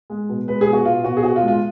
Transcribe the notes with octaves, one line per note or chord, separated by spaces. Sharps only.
G#3
B2
G#3 B4
G#4
B2
F#4
B2 F4
B2 F#4
G#4
B2 F#4
F4
G#3
F4